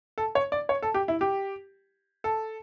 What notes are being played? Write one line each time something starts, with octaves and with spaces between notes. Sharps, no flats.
A4
C#5
D5
C#5
A4
G4
E4
G4
A4